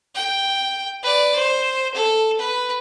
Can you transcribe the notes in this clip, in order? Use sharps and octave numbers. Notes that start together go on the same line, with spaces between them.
G5
B4 D5
C5
A4
B4